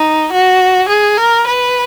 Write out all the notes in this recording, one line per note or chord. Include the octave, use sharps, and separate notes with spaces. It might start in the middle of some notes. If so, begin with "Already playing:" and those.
Already playing: D#4
F#4
G#4
A#4
B4